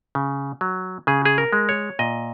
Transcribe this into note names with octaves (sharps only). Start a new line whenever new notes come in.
C#3
F#3
C#3 G#4
G#4
A#4
G#3
C#5
A#2 D#5